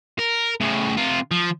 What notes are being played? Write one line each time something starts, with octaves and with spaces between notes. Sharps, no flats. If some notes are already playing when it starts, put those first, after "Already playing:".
A#4
A2 C#3
C3 F4
F3